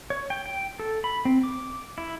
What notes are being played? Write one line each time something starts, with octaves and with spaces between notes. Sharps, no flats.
C#5
G5
G5
A4
B5
C4
D6
E4